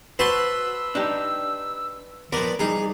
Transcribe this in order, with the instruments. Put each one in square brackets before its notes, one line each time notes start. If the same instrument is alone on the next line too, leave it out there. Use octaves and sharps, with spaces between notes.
[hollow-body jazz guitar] F#4 C5 [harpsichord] B4 A5 C6 [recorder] E6
[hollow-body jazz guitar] D4 D#4 G4
[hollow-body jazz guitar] F3 A#4 [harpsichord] B3 D5
[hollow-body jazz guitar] E3 G3 D#4 [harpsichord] G#4 [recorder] A#5